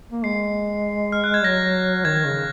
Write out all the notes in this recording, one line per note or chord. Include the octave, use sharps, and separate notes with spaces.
A#3
G#3 C7
F6
F#6
G#6
F#3 A#6
D#3 G#6
C#3